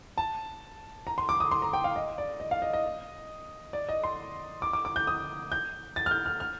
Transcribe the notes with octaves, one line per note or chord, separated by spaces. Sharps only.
A5
A#5
C6
D6
D#6
C6
A#5
G5
F5
D#5
D5
D#5
F5
D#5
D#5
D5
D#5
C6
D6
D6
D6
G6
D#6
G6
A6
F6
G6
F6
F6